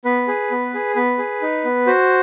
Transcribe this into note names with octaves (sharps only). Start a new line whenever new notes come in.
B3 B4
G#4
B3
G#4
B3 B4
G#4
D#4
B3
F#4 C5